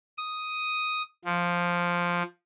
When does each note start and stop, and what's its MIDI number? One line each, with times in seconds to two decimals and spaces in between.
0.18 1.03 87
1.24 2.22 53